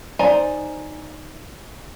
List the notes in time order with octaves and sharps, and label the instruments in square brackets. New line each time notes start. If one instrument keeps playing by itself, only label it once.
[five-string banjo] D#4 C5 D5 G#5 A#5